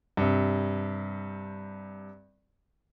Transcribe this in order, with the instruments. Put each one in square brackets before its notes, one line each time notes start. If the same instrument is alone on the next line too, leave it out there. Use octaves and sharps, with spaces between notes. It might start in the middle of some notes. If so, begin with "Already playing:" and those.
[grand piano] G2 C3